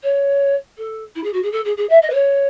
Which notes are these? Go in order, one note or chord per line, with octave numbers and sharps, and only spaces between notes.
C#5
A4
E4
G#4
F#4
G#4
A4
G#4
G#4
E5
D#5
B4
C#5